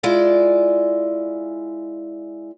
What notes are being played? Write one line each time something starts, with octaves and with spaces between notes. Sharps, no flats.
G#3 E4 F4 D5